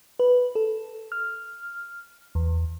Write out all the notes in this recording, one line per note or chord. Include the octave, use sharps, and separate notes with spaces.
B4
A4
F6
E2